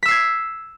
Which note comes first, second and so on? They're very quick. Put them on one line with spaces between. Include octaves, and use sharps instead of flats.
B6 E6 C7 G#6